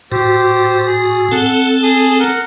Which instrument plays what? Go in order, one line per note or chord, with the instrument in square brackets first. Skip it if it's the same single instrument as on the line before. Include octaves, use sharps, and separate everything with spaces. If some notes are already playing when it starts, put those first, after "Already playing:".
[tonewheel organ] A2 F#4 [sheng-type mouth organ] G4 C5
[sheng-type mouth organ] G#4
[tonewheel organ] C4 A4 [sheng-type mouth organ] F#5 A5
[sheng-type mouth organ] G#4 A5 D#6
A#4 F#5